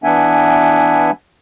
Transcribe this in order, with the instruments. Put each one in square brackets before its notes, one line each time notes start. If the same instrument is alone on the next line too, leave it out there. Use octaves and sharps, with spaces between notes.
[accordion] E3 B3 D4 E5 F#5 G#5